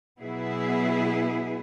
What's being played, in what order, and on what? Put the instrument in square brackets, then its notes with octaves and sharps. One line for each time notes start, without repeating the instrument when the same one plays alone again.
[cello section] B2 F#3 B3 E4 G#4